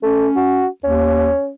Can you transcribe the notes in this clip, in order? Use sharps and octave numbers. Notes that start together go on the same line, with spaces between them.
A3 C#4
F#4
D#2 C#4